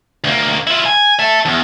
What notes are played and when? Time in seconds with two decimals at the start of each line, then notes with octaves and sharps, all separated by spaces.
0.24 D2 A#3
0.67 E4 F4
0.85 G#5
1.19 E5 A5
1.45 E2